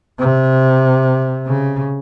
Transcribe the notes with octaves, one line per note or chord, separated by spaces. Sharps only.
C3
C#3